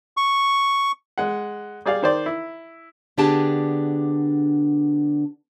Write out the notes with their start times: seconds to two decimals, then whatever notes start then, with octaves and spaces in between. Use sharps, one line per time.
0.17 C#6
1.18 G#3 F#5
1.85 G3 G#4 D5 F5
2.02 D#3 C5 D5
2.26 E4
3.17 D3 B3 D4 G4 G#4 A5